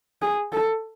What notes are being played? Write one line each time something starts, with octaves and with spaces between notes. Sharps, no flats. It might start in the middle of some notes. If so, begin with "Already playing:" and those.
G#4
A4